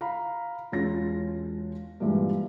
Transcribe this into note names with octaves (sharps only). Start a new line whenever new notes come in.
F5 A#5 B5
E1 G#3 C#4 F4 A#6
G2 A#2 E3 G#3